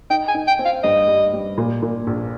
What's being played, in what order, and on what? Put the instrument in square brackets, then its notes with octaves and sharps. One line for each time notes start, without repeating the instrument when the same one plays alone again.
[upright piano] D#4 [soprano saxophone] G5
[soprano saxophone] G#5
[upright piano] D#4
[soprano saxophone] G5
[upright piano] C4
[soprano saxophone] F5
[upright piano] G2 [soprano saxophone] D#5
[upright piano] G3
G3
A#2
A#2
A#1